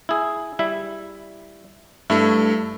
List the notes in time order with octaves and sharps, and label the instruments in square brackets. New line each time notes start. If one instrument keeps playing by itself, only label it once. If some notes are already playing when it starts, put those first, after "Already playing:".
[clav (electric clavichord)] E4 G#4
G3 E4 E5
[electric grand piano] G2 A3 [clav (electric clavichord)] E4